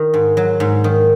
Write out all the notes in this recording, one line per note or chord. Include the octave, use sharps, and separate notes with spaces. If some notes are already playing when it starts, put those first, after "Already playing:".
Already playing: D#3
G#2
F#3
G#2
D#3